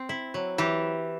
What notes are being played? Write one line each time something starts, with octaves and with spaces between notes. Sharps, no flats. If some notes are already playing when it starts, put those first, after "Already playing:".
Already playing: C4
E4
F#3
E3 G4